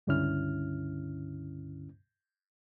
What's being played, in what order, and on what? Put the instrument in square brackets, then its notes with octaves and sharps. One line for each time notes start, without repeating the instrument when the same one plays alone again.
[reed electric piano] C#2 G2 D3 C#4 E4 F6